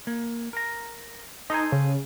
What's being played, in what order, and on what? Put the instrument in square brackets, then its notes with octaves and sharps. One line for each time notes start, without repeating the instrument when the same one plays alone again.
[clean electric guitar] A#3
A#4 A#5
[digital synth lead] D#4 [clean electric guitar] A4 C5 G#5
[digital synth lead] C#3